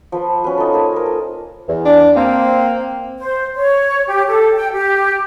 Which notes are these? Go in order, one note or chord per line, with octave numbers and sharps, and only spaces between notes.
F3 B4
C#4 F#4 B4 F5
C#4 D#4 F4 A4
A#3 A4 C5 G#5
A#4 D#5
A4
E2
D4
A#3 C4
C5
C#5
G4
A4
G5
G4